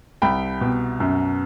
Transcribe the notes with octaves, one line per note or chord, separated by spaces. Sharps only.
C2 G5 B5
B2
F#2